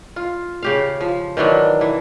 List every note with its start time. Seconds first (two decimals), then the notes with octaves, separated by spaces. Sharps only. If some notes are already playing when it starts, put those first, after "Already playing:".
0.16 F4
0.63 C#3 G4 F5
1.01 F3
1.37 D#3 E3 F#3 D4
1.81 E3